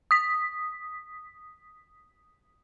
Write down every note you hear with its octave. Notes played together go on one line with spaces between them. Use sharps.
D#6 B6